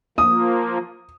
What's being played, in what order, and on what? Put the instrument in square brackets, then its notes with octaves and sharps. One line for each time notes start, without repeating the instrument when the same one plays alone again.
[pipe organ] F3 A#3 [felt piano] D#6